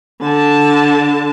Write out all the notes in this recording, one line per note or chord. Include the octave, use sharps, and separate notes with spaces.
D3 A5